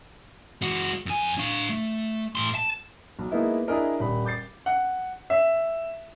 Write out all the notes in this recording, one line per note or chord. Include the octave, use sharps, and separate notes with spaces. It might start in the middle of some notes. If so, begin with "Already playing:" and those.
G#3 F#4
F2 G#5
D4 F5
A3
A2 C6
A5
B1
G#3 A#3 B3 D#4 E4
D4 E4 G#4 A#4 D#5
D#1 B5
D6 G6 A6 C7
F#5
E5